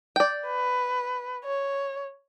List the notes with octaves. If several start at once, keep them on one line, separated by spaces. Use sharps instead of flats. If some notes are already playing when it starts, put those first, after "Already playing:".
D5 G5
B4
C#5